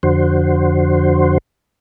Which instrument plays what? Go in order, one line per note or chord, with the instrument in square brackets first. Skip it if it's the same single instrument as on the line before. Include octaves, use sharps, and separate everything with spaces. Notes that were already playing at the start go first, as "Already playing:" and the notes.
[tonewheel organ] F2 D3 F#4 C5